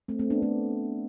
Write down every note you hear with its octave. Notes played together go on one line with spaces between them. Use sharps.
A3 C4
A3 C4
B3 D4
A3 C4